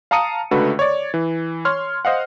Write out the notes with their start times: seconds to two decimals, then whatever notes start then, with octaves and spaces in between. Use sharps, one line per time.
0.11 F5 A5 A#5 D#6 C#7 D#7
0.51 C#2 D3 A3 F#4 B4
0.79 C#5 D5
1.14 E3
1.65 C#5 C6 F6
2.05 C5 D#5 F5 F#5